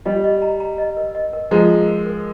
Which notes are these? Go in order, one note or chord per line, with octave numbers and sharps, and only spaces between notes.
G3 D#5
D#5
A#5
A#5
D#5
A#4
D#5
A#4
F3 G#3 A#5
A#4
A#4
A#4